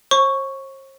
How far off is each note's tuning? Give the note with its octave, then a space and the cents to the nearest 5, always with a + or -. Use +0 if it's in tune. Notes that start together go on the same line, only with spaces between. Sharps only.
C5 +45 C#6 +0